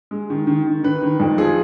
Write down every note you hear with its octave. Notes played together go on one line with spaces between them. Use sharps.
G#3
D#3
D#3
D#3
D#3 B4
D#3
F2
F3 G#4